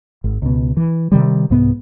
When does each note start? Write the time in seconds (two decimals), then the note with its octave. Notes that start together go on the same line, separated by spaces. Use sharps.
0.24 G#1
0.42 C#2 B2
0.77 E3
1.12 C3 D#3 G3
1.50 C2 G#2 C3 B3